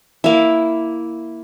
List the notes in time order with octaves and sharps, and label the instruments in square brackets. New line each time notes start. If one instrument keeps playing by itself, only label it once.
[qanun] A#3 E4